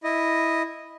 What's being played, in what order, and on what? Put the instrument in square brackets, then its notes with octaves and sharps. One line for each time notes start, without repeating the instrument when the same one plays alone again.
[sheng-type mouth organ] E4 D#5